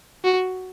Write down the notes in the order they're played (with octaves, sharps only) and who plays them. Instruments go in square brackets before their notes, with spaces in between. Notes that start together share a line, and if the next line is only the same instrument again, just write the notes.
[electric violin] F#4